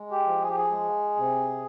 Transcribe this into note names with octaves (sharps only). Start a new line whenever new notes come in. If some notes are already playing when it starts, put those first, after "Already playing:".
Already playing: G#3
G4
F3
G#4
G4
G#4
G#3
C3